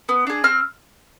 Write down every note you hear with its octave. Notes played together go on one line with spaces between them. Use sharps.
B3
D4 G#4
C4 F6